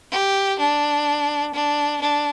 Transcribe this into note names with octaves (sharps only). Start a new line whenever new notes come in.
G4
D4
D4
D4